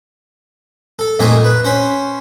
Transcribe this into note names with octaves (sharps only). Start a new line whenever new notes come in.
A4
F2 A#2 A3 D#4 G#5 C6
B4
C#4 C5 B5